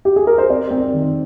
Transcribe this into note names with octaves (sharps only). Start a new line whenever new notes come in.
G4
G#4
A#4
C5
C4 D5
C4
D#3